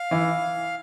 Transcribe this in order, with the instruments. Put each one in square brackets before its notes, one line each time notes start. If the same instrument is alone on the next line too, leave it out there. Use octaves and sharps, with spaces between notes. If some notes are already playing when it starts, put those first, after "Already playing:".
Already playing: [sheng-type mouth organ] F5
[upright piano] E3